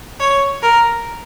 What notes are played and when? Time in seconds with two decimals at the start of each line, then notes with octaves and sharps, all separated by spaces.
0.20 C#5
0.62 A#4